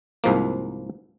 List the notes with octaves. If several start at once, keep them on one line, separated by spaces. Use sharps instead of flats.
C2 G#2 F3 A#3